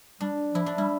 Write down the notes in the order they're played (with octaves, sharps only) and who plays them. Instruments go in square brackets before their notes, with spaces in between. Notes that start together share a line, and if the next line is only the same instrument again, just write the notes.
[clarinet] G3 [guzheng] D4
[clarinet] F3 [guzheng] E4
[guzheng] D4
[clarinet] G3 [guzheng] E4